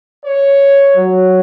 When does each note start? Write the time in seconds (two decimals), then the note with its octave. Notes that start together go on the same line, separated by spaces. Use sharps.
0.25 C#5
0.96 F#3